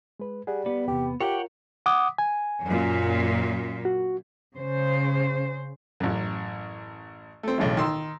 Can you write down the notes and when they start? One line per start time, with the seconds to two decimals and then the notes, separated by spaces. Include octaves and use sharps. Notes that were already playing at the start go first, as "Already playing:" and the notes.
0.20 G#3 B4
0.47 G3 G#4 F#5
0.66 B3 G4 D5
0.88 E2 C3 G4
1.21 F4 G4 A#4 C#5 F#5 G5
1.86 F#5 D6 D#6
2.18 G#5
2.64 F#2 A#2
3.85 F#4
4.56 C#3 C5
6.00 A1 F#2
7.43 A3 C4
7.58 B1 A2 C#3 E3
7.77 D#3 C6 E6